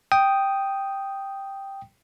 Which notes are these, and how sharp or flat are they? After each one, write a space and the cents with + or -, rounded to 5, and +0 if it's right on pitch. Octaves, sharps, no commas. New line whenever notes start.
G5 +0 D#6 +0